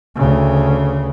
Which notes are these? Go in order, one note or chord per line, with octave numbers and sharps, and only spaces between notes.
D2 C#3